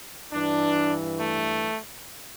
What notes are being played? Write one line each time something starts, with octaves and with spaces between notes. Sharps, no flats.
G2 E3 D4
A3